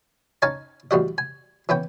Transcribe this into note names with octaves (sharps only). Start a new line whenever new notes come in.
C#4 D#4 C#5 F5 G#5 A5
A1 G3 F#4 D#5
G#5
E3 B3 C#4 G5